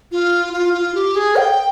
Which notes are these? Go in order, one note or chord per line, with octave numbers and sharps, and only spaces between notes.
F4
F4
F4
G4
G#4
G5